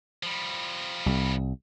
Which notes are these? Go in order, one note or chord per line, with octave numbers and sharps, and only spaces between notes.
F3 G3
C2